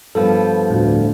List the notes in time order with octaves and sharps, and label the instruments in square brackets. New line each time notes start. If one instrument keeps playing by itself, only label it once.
[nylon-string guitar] G2 F3 B3 [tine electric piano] A4
[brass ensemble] D2 [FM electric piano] A2